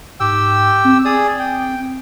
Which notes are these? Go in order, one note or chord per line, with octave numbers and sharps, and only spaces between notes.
G#2 G4 G5 E6
C4
G#4 D5 D#6
G5